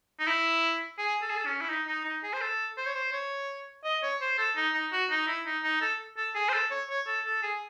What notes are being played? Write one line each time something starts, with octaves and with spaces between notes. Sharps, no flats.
D#4
E4
G#4
A4
G#4
A4
C#4
E4
D#4
D#4
D#4
G#4
C5
A4
C5
C#5
C5
C#5
D#5
C#5
C5
A4
D#4
D#4
F#4
D#4
E4
D#4
D#4
A4
A4
G#4
C5
A4
C#5
C#5
A4
A4
G#4